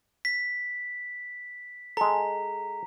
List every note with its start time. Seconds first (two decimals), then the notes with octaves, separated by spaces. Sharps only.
0.25 B6
1.97 G#3 A4 A#5